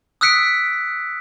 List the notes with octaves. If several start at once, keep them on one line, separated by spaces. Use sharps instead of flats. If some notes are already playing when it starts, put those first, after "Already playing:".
D#6 E6 F#6 B6 C#7 D7